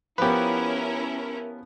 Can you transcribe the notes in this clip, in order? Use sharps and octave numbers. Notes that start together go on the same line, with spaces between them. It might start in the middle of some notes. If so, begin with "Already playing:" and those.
F3 B3 C#4 E4 G4 A#4 B4